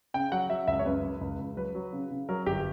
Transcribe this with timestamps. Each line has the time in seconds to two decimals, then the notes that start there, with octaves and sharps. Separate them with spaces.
0.14 C#3 G5
0.32 F#3 F#5
0.50 F#3 E5
0.68 C#2 E5
0.79 C#5
0.85 F#2 B4
1.03 F#2
1.21 C#2
1.39 C#2
1.57 F#3 B4
1.75 F#3
1.93 C#3
2.10 C#3
2.29 F#3 A#4
2.46 G1 G4